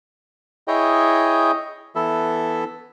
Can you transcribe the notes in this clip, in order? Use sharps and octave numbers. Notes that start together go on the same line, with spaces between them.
E4 G#4 C#5 D#5 G5
E3 B3 E4 A4 E5